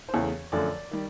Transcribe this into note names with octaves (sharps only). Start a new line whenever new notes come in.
C5
E2 C#3 E3 A3 C#5
F#2 D3 F3 A3 D5
D#3 G3